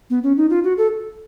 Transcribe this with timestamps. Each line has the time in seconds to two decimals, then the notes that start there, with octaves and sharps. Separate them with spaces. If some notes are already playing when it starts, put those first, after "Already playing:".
0.10 B3
0.23 C#4
0.37 D#4
0.50 F4
0.64 F#4
0.78 A4